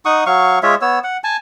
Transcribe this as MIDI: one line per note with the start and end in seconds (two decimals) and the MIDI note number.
0.05 0.24 63
0.05 0.24 78
0.05 0.24 85
0.05 0.24 87
0.26 0.59 54
0.26 0.59 77
0.26 0.59 85
0.63 0.75 56
0.63 0.75 65
0.63 0.75 73
0.63 0.75 76
0.82 0.99 59
0.82 0.99 73
0.82 0.99 88
1.04 1.17 78
1.24 1.37 80
1.24 1.37 81